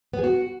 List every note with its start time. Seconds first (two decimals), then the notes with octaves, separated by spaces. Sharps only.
0.13 B3
0.19 G#4
0.24 F#4